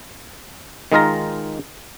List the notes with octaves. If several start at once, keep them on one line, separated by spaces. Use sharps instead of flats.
D#3 G#3 D#4 F4 A#4 A#5